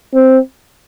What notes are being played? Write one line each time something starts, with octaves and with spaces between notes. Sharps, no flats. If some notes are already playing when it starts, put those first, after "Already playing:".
C4